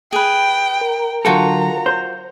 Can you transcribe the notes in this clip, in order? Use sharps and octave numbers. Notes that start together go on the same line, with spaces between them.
G#4 B4 G5
A#4
D3 F#3 F4 F#4 A4 G5 A#5
C5